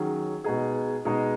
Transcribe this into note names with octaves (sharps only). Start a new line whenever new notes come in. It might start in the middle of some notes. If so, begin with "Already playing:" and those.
Already playing: D#3 F#3 C#4 G#4
B2 G#3 D#4 G#4
B2 G#3 D#4 G#4